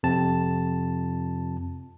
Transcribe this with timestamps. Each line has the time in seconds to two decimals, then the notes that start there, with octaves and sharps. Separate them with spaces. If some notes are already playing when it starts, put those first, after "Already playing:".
0.03 F2 C3 C4 A5